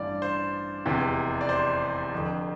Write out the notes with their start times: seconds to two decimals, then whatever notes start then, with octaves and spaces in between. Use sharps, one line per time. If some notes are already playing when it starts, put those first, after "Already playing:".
Already playing: A1 G2 E3 D5 F5
0.22 C5
0.86 F1 E2 C3 E3
1.41 D5
1.49 C5
2.13 F1 F2 D3